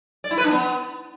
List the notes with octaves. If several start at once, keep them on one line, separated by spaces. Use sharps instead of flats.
D5
E4
B4
D4
B3